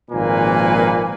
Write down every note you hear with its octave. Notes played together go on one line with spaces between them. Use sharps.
G#1 A#2 F3 A#3 B4 G#5